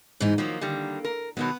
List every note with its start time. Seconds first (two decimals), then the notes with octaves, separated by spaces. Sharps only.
0.20 G#2 E3 D#4
0.38 D#3 F3 F#3 A#3
0.61 D3 D#3 G3
1.04 A#4
1.37 B2 D#3 F#3 B3